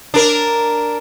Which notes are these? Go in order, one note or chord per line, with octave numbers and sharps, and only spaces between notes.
D4 A#4